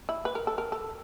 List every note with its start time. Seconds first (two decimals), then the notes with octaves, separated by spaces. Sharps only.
0.09 E4
0.25 B4
0.35 A#4
0.47 A4
0.58 A#4
0.72 A4